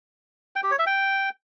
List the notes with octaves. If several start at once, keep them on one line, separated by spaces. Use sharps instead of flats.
G5
G4
C#5
E5
G5